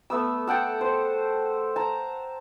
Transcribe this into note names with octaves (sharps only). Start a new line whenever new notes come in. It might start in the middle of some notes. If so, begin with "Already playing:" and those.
A3 B3 E6
A4 F#5 G5 A5
C5
A5 A#5